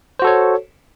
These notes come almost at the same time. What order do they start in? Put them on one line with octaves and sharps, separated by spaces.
C5 F#4 A4 C#5